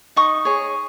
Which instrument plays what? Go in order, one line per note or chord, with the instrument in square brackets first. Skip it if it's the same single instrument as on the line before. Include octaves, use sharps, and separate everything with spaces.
[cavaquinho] D#4 C#6 D#6
G#4 C#5